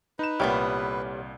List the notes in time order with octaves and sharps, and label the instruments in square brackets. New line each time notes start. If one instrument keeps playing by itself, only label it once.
[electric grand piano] D#4 E7 [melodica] B4
[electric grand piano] C2 A#2 [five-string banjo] G3 A3 B3 [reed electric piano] G4 C#5 F6